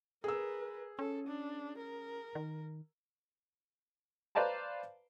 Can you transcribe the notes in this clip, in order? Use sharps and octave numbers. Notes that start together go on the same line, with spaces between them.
G#4 A#4 B4 E6
C#4 A4
D4
A#4
D#3
B4 C5 D5 F5 A5 A#5